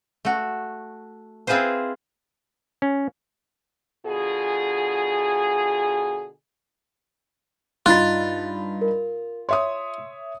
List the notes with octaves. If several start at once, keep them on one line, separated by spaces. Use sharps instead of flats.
A3 F#4
C4 E4 F4 G#4 B4 C5
C#4
B2 D3 F4 G#4
G2 D#4 F4 B5 F#6 A6
A#4
C#5 E5 C6 D#6